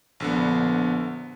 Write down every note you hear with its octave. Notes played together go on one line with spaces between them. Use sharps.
A#1 D3 B3